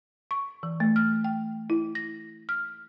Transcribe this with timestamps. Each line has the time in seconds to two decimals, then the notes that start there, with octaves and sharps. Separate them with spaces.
0.31 C#6
0.63 E3
0.80 A3
0.96 F6
1.24 G5
1.70 E4
1.95 A#6
2.49 F6